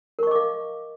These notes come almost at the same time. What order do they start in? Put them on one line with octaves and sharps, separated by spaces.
A#4 C#6 D#5 D6 F5